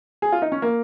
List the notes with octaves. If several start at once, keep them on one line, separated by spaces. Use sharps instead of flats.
G#4
F4
D#4
C#4
A#3